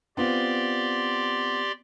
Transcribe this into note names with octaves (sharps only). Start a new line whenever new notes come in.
B3 C4 F4 G4 D5 C6